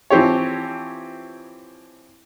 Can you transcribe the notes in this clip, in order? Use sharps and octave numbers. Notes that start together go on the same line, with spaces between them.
E3 F3 C4 G4 C#5